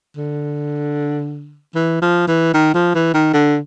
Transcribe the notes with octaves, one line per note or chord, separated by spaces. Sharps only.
D3
E3
F3
E3
D#3
F3
E3
D#3
D3